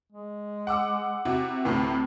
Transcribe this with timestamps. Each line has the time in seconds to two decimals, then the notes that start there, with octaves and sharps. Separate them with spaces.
0.12 G#3
0.67 F#5 D6 E6
1.25 C3 E4 F#4
1.65 D2 A2 C3 B4